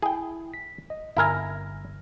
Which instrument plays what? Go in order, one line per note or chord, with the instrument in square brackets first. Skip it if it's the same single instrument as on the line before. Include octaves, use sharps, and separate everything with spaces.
[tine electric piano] E4 [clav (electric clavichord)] G#4 G5
[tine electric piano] B6
D#5
[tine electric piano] G1 F6 A#6 [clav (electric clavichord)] E4 A#4 G#5